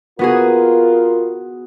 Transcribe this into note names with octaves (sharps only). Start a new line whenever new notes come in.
B3 F4 F#4 G#4 A#4